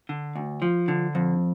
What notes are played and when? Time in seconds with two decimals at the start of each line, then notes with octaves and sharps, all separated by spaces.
0.09 D3
0.36 D2
0.62 F3
0.88 D3
1.15 F2